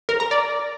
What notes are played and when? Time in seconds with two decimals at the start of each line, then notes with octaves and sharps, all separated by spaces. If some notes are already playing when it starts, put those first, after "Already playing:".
0.09 A#4
0.20 A#5
0.31 D5